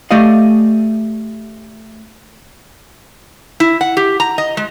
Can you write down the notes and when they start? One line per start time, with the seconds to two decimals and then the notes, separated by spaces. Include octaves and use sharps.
0.11 A3 G4 D5 D#5 F5
3.60 E4
3.81 F#5
3.97 G4
4.20 A#5
4.38 D#5
4.57 G#3